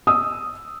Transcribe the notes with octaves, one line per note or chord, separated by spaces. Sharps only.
D#6 E6